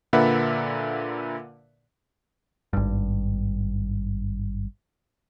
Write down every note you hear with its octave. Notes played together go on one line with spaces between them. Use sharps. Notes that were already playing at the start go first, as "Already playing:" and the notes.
A#2 D3 A#3 B4 E5 F#5
G#1 G2